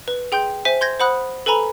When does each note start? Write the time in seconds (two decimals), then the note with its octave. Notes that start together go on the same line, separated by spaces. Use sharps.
0.08 B4
0.32 G#4 G5 C6 G6
0.65 C5 E5 G#5 B6
0.81 C6 G6 G#6 A#6
1.00 C5 F#5 B5 D#6 F#6
1.46 A4 B4 G#5 A#5 B5